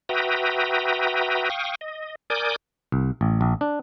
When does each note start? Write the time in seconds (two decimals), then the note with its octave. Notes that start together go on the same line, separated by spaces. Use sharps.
0.09 F#4 B4 E5 G5 A#5 D#6
1.50 F5 G5 C#6 D#6
1.81 D#5
2.30 A#4 D5 G#5 D6 D#6 G6
2.92 C2
3.21 A1
3.41 A#1
3.61 D4